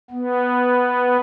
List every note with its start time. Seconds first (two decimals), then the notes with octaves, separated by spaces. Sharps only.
0.11 B3